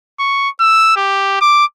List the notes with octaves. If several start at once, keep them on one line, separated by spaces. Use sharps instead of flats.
C#6
E6
G4
D6